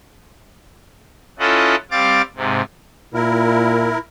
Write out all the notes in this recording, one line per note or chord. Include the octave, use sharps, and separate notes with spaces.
C#4 E4 F4 A4 D#5 F#5
G3 C4 F5 D6 A6
G#2 C3
A#2 E4 A#4